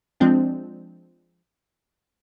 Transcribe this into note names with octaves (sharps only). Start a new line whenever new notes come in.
F3 G#3 C4 D4